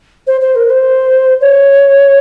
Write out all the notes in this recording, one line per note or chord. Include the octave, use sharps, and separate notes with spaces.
C5
C5
A#4
C5
C#5